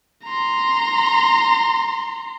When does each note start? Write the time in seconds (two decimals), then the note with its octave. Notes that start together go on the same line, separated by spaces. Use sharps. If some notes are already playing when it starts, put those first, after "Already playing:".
0.24 A#5 C6